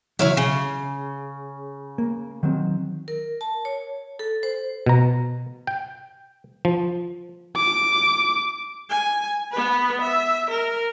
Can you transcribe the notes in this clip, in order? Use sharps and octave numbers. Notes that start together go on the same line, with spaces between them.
C#3 E3 F#3 E4 C#5 F5
C#3 F5
A#3
D#3 F#3 C4
A#4
A5
C#5
A4
C5
B2 A#5
G5
F3
D6
G#5
B3 B4
E5
A#4